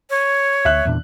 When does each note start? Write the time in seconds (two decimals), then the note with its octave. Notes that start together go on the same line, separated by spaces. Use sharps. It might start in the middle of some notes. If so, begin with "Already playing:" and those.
0.10 C#5
0.65 D2 E5 F#6
0.85 E2 A#2 D4